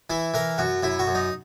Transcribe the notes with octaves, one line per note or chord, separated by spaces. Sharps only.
E3 E4
E3 A#4
F#2 F#4
F#2 E4
F#4
F#2
D#4